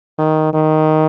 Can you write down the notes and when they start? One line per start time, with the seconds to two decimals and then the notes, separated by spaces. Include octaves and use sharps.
0.18 D#3
0.54 D#3